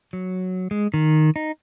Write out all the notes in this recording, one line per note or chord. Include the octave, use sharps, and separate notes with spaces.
F#3
G#3
D#3
D#4